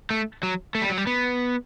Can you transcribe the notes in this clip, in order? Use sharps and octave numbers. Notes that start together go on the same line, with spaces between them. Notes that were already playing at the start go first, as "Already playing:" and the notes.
A3
F#3
A3
G3
F#3
G3
B3